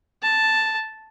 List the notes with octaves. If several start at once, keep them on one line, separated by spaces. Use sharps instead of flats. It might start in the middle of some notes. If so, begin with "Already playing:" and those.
A5